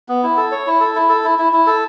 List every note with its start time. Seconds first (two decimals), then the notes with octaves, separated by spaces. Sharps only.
0.09 B3
0.23 E4
0.37 A4
0.52 C#5
0.67 E4
0.80 A4
0.95 E4
1.09 A4
1.24 E4
1.39 E4
1.53 E4
1.67 A4